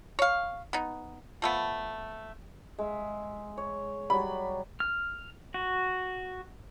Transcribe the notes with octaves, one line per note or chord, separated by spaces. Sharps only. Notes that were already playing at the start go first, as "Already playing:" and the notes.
C#5 F5
B3 D#4
F3 A3 B3
G#3 E5
C#5
F#3 G3 B5
F6
F#4